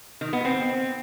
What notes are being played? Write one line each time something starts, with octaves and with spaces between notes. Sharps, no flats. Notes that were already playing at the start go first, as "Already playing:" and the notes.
D#3
B3
C4